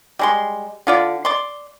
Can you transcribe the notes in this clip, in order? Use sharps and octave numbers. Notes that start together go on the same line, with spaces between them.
G3 G#3 C6
D3 F4 D5
D5 C6